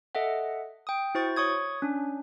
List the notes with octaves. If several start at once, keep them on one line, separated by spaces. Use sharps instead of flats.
A4 D#5 E5 F#5
G5 D#6
E4 F#4 C5 C#6 A6
C#5 C#6 D#6 G#6
C#4 D4